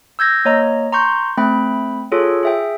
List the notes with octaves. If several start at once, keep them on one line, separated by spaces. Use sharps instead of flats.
E6 G6 G#6 A#6
A#3 C#5 D#5 A#5
A#5 C6 C#6 G6
A3 C4 G5 B5
F4 G#4 A4 C#5
G#4 E5 G5